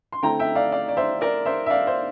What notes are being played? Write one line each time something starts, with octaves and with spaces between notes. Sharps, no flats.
C6
D3 A3 C4 E4 G5 A#5
E5 G5
D5 F5
D5 F5
D5
C5 E5
A#4 D5
C5 E5
E5
D5 F5
C5 E5